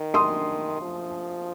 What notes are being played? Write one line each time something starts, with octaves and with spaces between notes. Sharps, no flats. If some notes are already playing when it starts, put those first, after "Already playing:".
Already playing: D#3
C6 D#6
F3